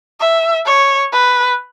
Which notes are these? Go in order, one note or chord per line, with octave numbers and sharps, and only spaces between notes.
E5
C#5
B4